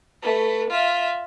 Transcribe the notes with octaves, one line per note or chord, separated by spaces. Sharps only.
A3 B4
F4 E5